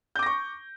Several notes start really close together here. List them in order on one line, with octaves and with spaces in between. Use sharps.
G6 D6 A#6 C#6